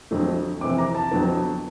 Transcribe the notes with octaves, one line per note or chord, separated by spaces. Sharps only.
F2 D3 F#3 A3
F2 C3 E3 D6
A#5
A5
F2 D3 F#3 B3